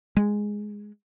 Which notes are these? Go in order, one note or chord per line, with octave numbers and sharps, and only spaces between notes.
G#3